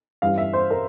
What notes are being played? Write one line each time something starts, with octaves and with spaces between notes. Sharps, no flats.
G2 E3 G3 C#4 F5
E5
C5
A#4